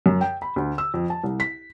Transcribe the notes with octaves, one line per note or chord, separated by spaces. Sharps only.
F#2
G5
B5
D2
E6
F2
A5
C2
B6